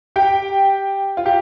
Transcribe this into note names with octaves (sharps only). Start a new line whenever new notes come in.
G4 G5
F4
G4